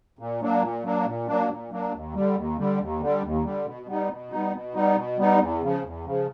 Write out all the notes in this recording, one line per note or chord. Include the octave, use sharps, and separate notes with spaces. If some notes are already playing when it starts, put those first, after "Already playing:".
A#2
F#3 A#3 D4
A#2
F#3 A#3 D4
A#2
F#3 A#3 D4
A#2
F#3 A#3 D4
D#2
D3 G3
D#2
D3 G3
D#2
D3 G3
D#2
D3 G3
B2
G3 B3 D#4
B2
G3 B3 D#4
B2
G3 B3 D#4
B2
G3 B3 D#4
E2
C#3 F3
E2
C#3 F3